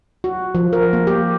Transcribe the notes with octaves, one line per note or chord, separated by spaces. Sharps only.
F#4
F3
A#4
A#3
G4